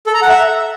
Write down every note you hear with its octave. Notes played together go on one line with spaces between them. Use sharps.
A4
A#5
F#5
E5